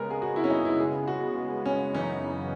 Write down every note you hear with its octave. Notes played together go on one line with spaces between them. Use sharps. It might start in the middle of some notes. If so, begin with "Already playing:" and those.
Already playing: C#3 G#3 B3 A#4
G#4
F#4
E4
C#4
D#4
E4
G#4
F#4
C#4
F#2 C#3 E3 B3 C#4 D#4